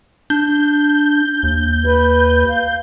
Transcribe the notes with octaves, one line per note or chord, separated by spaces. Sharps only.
D4 G6
D#2
D#2 B4
F5